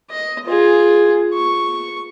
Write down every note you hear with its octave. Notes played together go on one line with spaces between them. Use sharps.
D#5
F4 G#4
C#6